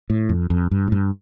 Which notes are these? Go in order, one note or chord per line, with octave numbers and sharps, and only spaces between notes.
A2
F2
F2
G2
A2
G2